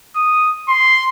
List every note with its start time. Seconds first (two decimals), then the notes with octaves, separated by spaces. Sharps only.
0.16 D#6
0.69 C6